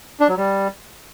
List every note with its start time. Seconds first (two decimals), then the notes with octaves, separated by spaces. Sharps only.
0.20 D4
0.29 F#3
0.37 G3